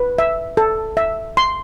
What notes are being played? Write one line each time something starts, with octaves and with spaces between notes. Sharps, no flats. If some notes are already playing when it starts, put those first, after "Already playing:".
Already playing: B4
E5
A4
E5
C6